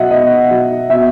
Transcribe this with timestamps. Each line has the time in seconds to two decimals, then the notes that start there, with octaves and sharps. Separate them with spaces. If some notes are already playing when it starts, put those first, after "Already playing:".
Already playing: B2 F#3 D#5 E5 F#5
0.10 B2 D#5
0.51 F#3
0.90 B2 E5